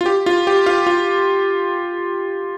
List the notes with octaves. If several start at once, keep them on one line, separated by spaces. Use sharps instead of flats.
F4
G4
F4
G4
F4
F4